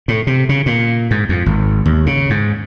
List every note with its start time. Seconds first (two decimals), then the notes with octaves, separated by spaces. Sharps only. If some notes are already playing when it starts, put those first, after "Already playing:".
0.08 A2
0.27 C3
0.49 C#3
0.66 A#2
1.11 G#2
1.29 F2
1.46 G#1
1.86 D#2
2.06 C#3
2.30 G#2